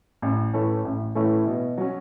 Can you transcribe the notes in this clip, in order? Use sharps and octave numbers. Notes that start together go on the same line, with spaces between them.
A1
A2 E3 A3 C#4
A1
A2 E3 A3 C#4
B2
F#3 C#4